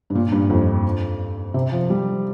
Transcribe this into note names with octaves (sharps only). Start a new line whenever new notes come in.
G2
A#2
G2
F2
C3
F3
G3